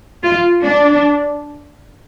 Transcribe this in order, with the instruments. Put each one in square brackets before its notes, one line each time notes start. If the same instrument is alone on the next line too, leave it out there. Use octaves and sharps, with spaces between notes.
[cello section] F4
D4